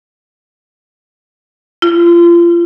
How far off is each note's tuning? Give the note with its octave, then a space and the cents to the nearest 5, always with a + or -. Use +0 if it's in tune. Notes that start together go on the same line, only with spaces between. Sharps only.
F4 -30